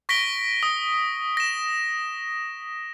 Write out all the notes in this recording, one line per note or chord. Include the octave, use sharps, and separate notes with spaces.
C#6 A#6 B6 D7 G7
D#6
A#6 E7